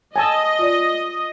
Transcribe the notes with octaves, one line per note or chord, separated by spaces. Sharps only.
C#5 D#5 G#5 A5 E6
F4 D5